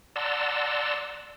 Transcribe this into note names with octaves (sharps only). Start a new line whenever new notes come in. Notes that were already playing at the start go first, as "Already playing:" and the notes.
D5 F#5 A5 A#5 C6 E6